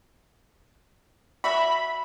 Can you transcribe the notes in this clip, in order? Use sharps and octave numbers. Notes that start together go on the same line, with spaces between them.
F#4 E5 B5